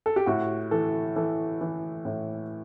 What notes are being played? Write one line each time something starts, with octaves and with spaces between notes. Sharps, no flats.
A4
G4
A2 F#4
E3 A4
E3 A4
E3
A2